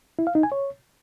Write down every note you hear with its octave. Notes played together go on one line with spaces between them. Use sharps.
E4
F5
D#4
G#5
C#5